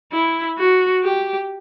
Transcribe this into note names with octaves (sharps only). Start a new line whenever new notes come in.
E4
F#4
G4